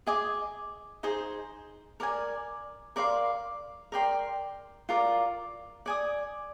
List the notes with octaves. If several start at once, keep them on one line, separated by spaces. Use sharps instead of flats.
G#4 D#5 G#5 D6
D#4 G#4 C5
A#4 D5 G#5
A#4 D5 F5 C6
A#4 D5 G5 C6
F4 A#4 D5
D5 G#5 D#6